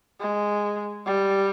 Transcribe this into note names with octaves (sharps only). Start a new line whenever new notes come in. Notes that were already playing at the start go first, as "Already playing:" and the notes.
G#3
G3